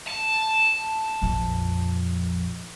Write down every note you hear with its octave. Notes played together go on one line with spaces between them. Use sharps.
A5
A#1 F2